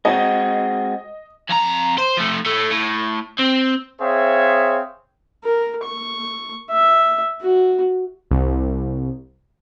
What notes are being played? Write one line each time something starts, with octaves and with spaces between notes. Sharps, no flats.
G#3 C4 F#4 D#5
F2 A#5
C5
F3 A3
A2 A3
A2
C4
C4 G#4 C5 C#5 E5 F5
A#4
C#6
E5
F#4
C2